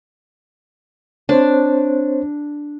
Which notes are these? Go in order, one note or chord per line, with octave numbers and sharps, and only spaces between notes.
C4 D4 C5 C#5